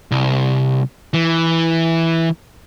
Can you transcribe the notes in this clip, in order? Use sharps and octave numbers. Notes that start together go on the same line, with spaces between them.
C2
E3